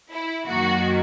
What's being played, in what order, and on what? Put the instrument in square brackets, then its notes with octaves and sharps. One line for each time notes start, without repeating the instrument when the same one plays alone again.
[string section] E4
F#2 D#3 A#3 F#4